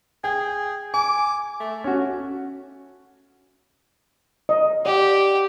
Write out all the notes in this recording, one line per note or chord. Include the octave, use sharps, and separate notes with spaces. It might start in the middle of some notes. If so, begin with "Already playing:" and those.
G#4 G5
G#5 D6
A3
C#4 F#4
D#5
G4 D5 F#5